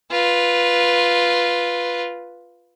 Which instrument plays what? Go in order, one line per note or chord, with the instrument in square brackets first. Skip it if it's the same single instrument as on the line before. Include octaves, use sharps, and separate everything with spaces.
[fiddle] F4 B4